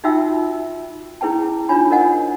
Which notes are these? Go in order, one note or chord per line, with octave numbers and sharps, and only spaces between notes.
D#4 F4 F#4 E5 G5 E6
C#4 E4 G#4 B4 G5 A5
D4 D#4 F4 C#5 G#5 B5
A#4 C5 D#5 F#5 G#5